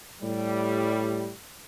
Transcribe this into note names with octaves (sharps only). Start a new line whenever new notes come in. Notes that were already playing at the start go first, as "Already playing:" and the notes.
A2 G3